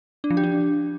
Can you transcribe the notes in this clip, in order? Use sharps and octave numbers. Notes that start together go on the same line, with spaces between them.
D4
F3
G4
D4